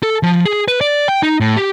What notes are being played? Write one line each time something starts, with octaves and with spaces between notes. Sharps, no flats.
A4
F3
G#4
B4
D5
G5
D#4
A2
G4